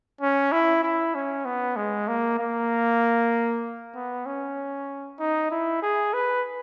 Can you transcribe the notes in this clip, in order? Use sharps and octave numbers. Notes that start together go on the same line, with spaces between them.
C#4
E4
E4
C#4
B3
G#3
A#3
A#3
B3
C#4
D#4
E4
G#4
B4